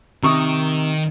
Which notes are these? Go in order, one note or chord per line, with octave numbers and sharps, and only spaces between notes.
C3 D#3 A#5 C#6 D#6